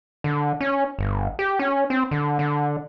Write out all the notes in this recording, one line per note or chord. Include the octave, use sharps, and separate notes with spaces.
D3
C#4
G1
G4
C#4
C4
D3
D3